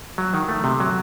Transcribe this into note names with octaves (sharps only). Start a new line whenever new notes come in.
F#3
D#3
A3
C3
F#3